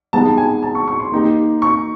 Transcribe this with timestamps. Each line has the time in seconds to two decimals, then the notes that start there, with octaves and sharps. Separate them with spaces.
0.13 G#3 B3 D#4 G4 A5
0.37 G#5
0.63 A5
0.75 C#6
0.88 C#6
1.00 C6
1.12 A#3 D#4 G4
1.62 C#6